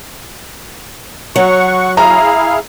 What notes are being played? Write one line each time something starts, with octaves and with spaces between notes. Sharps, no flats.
F#3 F#5 C#6
E4 G#4 F5 A#5